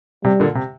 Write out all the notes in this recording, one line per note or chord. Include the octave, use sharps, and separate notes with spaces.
C3 G3
A#2 D3
C3